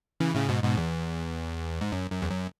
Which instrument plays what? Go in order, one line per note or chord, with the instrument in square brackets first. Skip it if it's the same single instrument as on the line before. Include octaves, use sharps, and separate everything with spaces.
[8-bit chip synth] C#3 E3
A2 C#3
G#2 B2
G#2 B2
E2
G#2
F#2
F#2
E2
F#2